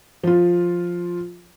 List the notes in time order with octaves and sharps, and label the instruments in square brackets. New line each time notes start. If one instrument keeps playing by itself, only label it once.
[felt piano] F3 F4